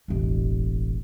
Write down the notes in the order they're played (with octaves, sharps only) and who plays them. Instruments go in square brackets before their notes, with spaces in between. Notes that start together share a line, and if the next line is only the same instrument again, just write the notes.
[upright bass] E1 A1